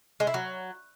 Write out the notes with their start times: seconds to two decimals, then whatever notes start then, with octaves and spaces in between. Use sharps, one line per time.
0.20 G#3
0.27 E4
0.34 F#3